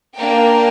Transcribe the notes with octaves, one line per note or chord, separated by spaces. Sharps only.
A#3 D4 A#4 G5